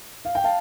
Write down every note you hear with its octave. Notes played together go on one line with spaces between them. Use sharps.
F5
G5
F5 A5